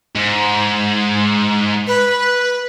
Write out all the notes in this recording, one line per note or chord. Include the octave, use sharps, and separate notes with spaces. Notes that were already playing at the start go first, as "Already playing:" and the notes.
G#2
B4